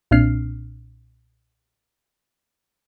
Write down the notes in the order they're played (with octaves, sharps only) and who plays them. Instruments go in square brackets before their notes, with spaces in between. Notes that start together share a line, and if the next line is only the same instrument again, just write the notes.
[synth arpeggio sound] B1 A#2 C4 D4 F6 C7